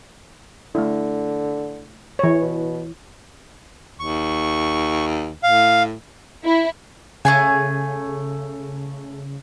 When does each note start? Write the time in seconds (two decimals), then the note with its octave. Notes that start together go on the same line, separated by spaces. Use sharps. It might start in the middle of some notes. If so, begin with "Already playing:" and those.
0.75 D3 A3 E4
2.19 E3 C#5
2.42 B2
4.00 D#2 C#6
5.43 A2 F5
6.44 E4
7.25 C#3 A3 G#4 G#5